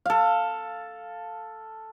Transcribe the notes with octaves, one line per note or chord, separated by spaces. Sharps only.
A4 F5